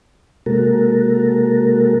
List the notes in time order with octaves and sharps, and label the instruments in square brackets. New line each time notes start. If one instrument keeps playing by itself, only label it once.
[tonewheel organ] C3 G#3 A#3 F#4 A4 A#4